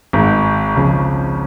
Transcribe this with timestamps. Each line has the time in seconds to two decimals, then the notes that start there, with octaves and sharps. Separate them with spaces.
0.13 G#1 G#2 G#3
0.75 C#2 C#3 F3 C#4